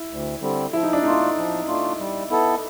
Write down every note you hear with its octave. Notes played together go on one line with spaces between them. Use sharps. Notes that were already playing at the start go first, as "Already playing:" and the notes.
Already playing: E4
D2
D3 G3 C4
F3 E4
D#4
D4
A3 D4 D#4 F4
F3
A3 D4 F4
G3
B3 E4 A4